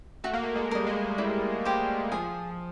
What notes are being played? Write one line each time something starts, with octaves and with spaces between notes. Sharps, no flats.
A3 F#4
A#3
A3
G#3
G3 A#4 D#5
G#3
G3 E4
G4 C5
F3 G#4